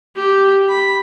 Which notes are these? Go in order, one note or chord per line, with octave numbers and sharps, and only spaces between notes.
G4
B5